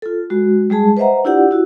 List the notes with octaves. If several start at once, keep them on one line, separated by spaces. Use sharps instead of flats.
F4 A4
G#3 F#4
G3 G#3 G#4 A5
B4 C5 D#5 E5 F#5 A#5
D4 E4 F4 G4 D5 F#5
E4 F#4